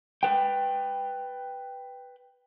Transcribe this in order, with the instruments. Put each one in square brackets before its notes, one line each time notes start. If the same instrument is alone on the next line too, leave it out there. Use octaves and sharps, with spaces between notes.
[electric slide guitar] B4 G5